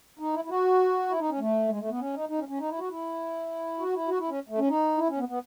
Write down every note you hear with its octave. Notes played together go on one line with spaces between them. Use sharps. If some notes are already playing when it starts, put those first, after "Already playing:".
D#4
E4
E4
F#4
E4
D#4
C#4
A3
G#3
A3
B3
C#4
D#4
D#4
C#4
C#4
D#4
E4
F#4
E4
F#4
E4
F#4
E4
C#4
A3
C#4
D#4
E4
C#4
B3
B3